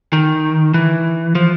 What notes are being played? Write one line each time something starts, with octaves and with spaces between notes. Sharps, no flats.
D#3
E3
F3